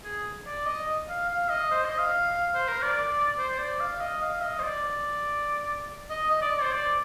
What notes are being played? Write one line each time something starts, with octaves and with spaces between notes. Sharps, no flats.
G#4
D5
D#5
F5
F5
D#5
C5
D#5
F5
C5
A#4
D5
C5
D5
F5
D#5
F5
D#5
C5
D5
D5
D#5
D#5
D5
D5
C5
D5